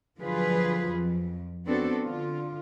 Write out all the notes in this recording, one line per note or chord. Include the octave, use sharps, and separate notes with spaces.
D3 F3 F#3 F4 G#4 B4
F2
B3 C4 D4 F#4 A4
D3 F4